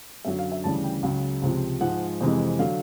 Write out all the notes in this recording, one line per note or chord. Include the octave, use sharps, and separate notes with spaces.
F#2 D3 F#3 E5
F5
E5
D2 C#3 E3 G3 A5
G5
C#2 C#3 F#3
C#2 C3 F3
G#2 F3 G#3 F#5
F2 C3 E3 G#3
D3 F#3 F5